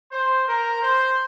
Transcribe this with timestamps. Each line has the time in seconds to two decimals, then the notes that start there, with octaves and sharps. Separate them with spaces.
0.12 C5
0.48 A#4
0.83 C5